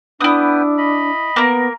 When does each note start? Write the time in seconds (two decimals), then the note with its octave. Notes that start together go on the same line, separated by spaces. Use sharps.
0.21 B3 D4 E4 B4 G5 D#6
0.78 D#5 B5
1.36 A#3 B3 A#4